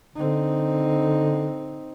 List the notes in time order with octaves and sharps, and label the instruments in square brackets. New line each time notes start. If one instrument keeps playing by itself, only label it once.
[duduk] D3 [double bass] C4 D#4